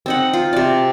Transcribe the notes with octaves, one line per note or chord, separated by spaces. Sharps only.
C4 D#4 F#5
F4
C3 D5